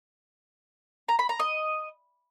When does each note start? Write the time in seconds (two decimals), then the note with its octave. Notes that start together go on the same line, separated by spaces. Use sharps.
1.09 A#5
1.19 B5
1.29 A#5
1.40 D#5